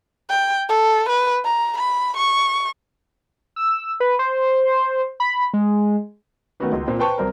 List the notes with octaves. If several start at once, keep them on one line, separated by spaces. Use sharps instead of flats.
G5
A4
B4
A#5
B5
C#6
E6
B4
C5
B5
G#3
D#3 A3 B3 C#4 F#4 B4
C#2
A#2 C4
B4 C5 G5 A5 C#6
C2 C4 A#4